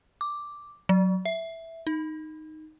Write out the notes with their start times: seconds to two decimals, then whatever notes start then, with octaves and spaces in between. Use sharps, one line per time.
0.21 D6
0.89 F#3
1.25 E5
1.87 D#4